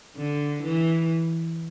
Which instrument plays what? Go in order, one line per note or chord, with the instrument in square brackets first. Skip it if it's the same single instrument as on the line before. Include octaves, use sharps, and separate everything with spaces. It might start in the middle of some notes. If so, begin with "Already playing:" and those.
[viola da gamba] D3
E3